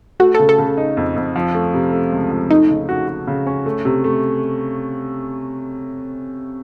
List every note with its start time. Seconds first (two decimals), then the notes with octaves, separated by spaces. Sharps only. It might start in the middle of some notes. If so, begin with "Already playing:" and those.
0.20 A3 F#4
0.34 C#3 A4
0.49 A4
0.59 C#3
0.77 D#4
0.97 F2
1.16 F2
1.36 F3
1.55 A3
1.74 C3
1.93 A3
2.12 C#2
2.31 F3
2.50 A3 D#4
2.70 C#3
2.89 F#4
3.08 F#4
3.27 C#3
3.47 C#4
3.66 A3
3.85 C3
4.04 A3